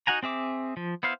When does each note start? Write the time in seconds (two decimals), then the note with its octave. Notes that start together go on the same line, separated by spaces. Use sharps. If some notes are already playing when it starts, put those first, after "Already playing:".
0.07 D#4 F#4 F#5 G#5 A#5
0.23 C4 G#4 E5 D6
0.77 F3
1.03 B3 E4 C5 F5